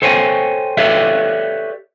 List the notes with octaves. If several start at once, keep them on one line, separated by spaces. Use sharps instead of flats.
A4 C5 C#5 G5 G#5
G4 A4 B4 C#5 D5 E5